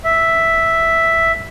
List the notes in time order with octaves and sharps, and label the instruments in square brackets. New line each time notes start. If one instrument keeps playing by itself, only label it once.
[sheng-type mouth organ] E5